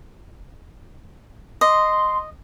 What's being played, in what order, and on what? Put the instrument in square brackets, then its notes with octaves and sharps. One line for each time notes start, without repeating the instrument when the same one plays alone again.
[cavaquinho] D#5 [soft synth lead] C6